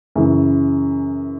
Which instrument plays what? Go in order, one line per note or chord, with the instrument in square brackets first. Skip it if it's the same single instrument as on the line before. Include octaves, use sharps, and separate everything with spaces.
[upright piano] F#2 C#3 E3